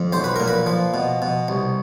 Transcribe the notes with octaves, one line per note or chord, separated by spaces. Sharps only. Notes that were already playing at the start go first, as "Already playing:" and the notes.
Already playing: F2
B1 C5
B4
A#2 A#4
B4
F3
B2
B2
C2